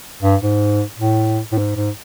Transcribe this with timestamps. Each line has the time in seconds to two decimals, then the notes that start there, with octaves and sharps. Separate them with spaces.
0.23 G2
0.42 G#2
0.99 A2
1.52 A2
1.58 G#2
1.76 G#2